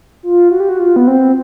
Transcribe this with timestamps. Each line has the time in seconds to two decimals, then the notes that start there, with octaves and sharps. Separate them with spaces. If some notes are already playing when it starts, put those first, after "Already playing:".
0.23 F4
0.51 F#4
0.60 G4
0.69 F#4
0.79 F4
0.96 B3
1.07 C4